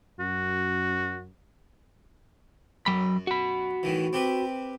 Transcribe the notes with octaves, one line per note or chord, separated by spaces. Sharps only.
F#2 F#4
F#2 F#3 B5
F#4 B5
A2 D#3 E3
C4 G4 B4